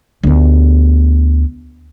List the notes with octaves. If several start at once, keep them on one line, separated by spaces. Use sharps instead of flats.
D2 B3